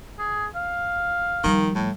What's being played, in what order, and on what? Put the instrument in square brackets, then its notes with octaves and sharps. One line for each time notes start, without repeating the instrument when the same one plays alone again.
[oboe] G#4
F5
[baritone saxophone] D#3 [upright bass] F3 G3
[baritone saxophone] A2